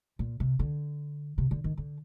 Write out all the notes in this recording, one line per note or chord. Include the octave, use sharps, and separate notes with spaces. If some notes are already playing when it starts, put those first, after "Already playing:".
A#2
C3
D3
C3
D3
D#3
D3